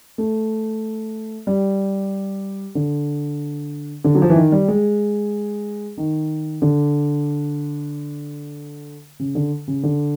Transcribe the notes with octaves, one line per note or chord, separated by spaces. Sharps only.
A3
G3
D3
D3
F#3
F3
E3
D#3
G3
G#3
D#3
D3
C#3
D3
C#3
D3